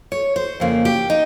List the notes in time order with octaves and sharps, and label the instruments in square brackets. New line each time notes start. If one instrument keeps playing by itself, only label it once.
[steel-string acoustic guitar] C#5
C5
F2 C#3 F3 A#3
G4
D#4